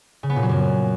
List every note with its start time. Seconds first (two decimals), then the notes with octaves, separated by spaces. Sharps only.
0.23 C#3
0.30 B3
0.36 A#2
0.43 F#3
0.49 F#2